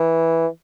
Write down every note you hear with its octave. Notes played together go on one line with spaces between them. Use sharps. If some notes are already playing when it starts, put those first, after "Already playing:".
Already playing: E3